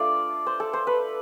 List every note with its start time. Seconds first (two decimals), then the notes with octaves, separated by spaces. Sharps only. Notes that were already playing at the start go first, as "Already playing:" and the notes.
Already playing: A3 D4 F4 D5
0.47 C5
0.60 A4
0.73 C5
0.87 B4